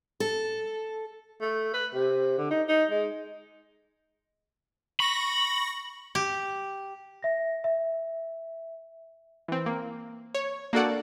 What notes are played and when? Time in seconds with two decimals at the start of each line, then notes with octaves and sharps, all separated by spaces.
0.20 A4
1.41 A3
1.73 B4
1.94 C3
2.38 D3
2.51 D#4
2.68 D#4
2.91 G#3
5.00 B5 C#6 A#6
6.15 G4
7.23 E5 A#6
7.64 E5
9.48 E3 C4
9.66 A#3
10.35 C#5
10.73 A#3 D4 F#4 A4 D5 F#5